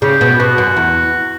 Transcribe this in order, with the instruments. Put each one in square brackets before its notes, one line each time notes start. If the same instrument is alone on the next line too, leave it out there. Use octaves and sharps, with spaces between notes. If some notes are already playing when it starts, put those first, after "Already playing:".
[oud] C#3 [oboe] G4
[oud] B2
[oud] B2 [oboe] F#4
[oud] F#2
E2